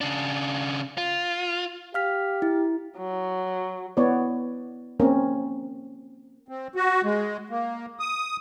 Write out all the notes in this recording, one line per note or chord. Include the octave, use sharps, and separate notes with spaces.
C#3 D4
F4
G4 F5 F6 B6
E4
F#3
B3 E4 C#5 D5
A#3 C4 C#4 A#4
C4
F#4
G#3
A#3
D#6